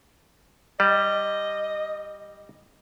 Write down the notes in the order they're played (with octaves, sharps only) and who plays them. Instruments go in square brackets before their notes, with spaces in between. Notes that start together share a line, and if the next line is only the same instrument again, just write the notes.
[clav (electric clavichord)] G3 [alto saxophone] D#5